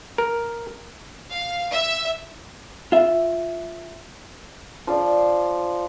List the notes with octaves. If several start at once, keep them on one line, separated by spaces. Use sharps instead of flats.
A#4
F5
E5
F4 E5
F3 C5 D5